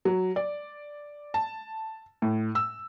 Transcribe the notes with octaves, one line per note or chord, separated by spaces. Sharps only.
F#3
D5
A5
A2
E6